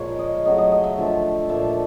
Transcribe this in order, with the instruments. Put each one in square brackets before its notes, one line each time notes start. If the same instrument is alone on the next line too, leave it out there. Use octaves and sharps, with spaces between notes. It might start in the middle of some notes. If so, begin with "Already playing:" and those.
Already playing: [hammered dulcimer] A#2 F3 G#3 A#4 C#5
D#5
C#3 F#3 A3 D#5
D#5
D#5
E5
D3 F3 A3
A#2 F3 A3 E5